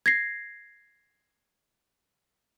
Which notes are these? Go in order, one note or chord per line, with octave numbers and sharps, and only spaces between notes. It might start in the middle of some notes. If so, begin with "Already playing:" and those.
G#6 A#6 C7